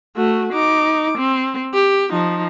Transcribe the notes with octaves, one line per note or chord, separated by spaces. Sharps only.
A3 F#4
D#4 D6
C4
G4
F3 D#4